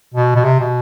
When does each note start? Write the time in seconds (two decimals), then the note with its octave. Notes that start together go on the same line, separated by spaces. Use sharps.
0.14 B2
0.35 B2
0.44 C3
0.60 B2